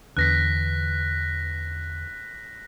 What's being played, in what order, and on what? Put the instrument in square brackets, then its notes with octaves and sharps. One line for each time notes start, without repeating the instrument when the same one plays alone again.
[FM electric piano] E2 D3 [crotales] F#6 A#6 B6